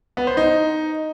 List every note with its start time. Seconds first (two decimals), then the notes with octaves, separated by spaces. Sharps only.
0.17 B3
0.27 C5
0.37 D#4